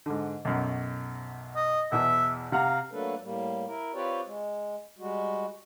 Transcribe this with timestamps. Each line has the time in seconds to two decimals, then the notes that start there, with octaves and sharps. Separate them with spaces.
0.06 G#2 D3
0.45 B1 F#2
1.56 D#5
1.92 E2 B2 E3 E5
2.52 C3 F5 F#5 A#5
2.90 F#3 A3 A#3 D4 A4 B4
3.22 A2 G3 A#3
3.67 E4 A#4
3.94 C4 F4 G4 B4 C#5 D5
4.26 G#3
4.98 G3 G#3 F#4